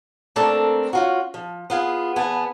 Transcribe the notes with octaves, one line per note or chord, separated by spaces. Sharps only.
A3 A#3 C4 D4 A4 A#4
C#4 F4 F#4
F3
B3 F4 G#4
E2 B3 G#5 A5